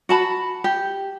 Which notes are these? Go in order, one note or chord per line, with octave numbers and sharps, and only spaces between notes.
F#4 A5 B5
G4